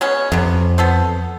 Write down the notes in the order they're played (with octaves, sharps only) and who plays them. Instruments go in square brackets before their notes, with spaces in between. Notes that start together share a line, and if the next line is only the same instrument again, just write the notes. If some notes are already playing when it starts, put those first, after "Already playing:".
[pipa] G#3 B3 C#4
[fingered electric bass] F2 [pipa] C3 B3
[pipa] B3 A4 C5